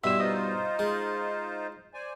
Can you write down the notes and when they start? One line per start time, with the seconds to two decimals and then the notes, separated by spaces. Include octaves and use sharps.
0.04 G2 B2 E4 G4 E5 C6 E6
0.20 D#4 F4 C5 D#5
0.79 G#3
1.94 C5 D5 G#5